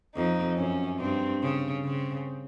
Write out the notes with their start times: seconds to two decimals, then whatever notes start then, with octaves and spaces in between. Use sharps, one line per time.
0.15 F2 D#4
0.57 F#2 C#4
1.00 G2 C4
1.42 C#3
1.84 C#3 C4